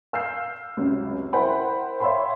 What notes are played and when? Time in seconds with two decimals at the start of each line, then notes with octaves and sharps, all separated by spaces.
0.13 F5 E6 F6 G6 C7
0.77 C#2 F#2 C3
1.33 E4 A#4 C5 F#5 G5 B5
2.00 C#5 E5 F5 G5 B5 C6